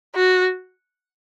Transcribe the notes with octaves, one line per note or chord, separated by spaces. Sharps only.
F#4